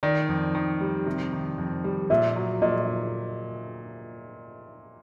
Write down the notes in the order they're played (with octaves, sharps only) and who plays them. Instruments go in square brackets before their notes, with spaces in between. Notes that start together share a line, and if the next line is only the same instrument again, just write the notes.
[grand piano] D#3 [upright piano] D5
[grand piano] F2
D#3
G3
C3
D#3
F2
G3
[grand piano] A#2 [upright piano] E5
[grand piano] F#3
[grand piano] A#2 [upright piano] D#5